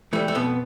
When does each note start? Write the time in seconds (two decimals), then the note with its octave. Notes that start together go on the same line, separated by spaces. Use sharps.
0.13 E3 G3 A3
0.28 A3
0.35 F2 B2 B3